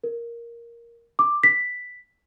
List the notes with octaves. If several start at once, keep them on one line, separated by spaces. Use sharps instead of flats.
A#4
D6
B6